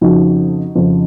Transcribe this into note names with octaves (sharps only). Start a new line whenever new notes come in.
F2 C#3 F3 D#4 F#4
F2 C#3 F3